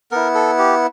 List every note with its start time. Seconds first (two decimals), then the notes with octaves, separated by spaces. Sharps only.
0.11 B3 E4 A#4
0.35 A4
0.59 G4